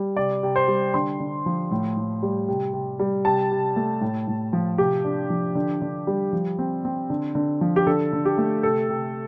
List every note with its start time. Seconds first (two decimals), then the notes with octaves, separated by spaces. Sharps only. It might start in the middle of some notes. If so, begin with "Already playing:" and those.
Already playing: G3
0.17 C3 D5
0.43 C3
0.56 C5
0.68 G3
0.94 D3 C6
1.20 D3
1.46 F3
1.71 A2
1.97 A2
2.23 G3
2.48 C3
2.73 C3
3.00 G3
3.25 C3 A5
3.51 C3
3.76 A3
4.01 A2
4.28 A2
4.53 F3
4.78 C3 G4
5.04 D4
5.30 F3
5.55 D3
5.82 D3
6.07 G3
6.33 F3
6.59 C4
6.85 C4
7.10 D3
7.35 D3
7.61 F3
7.76 G4
7.87 D3 A4
8.13 D3
8.25 G4
8.38 A3
8.63 C3 A4
8.89 C3